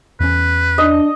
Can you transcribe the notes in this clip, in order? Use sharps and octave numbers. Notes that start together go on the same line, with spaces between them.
E2 C#4 B4
D4 D#5